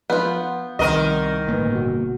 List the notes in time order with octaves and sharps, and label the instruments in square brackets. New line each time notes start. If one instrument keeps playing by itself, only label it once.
[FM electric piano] F3 F#5 G6 [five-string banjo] B3 F4
[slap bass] C2 [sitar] D#3 A#4 D#5
[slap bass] G1 A#3 [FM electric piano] A2 B4
[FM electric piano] B2 F#4